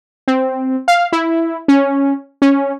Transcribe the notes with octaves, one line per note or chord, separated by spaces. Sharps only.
C4
F5
E4
C#4
C#4